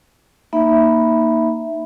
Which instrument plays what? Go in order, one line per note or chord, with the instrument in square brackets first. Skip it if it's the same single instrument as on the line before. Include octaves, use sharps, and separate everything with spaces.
[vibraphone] A#3 D#4 E5 B5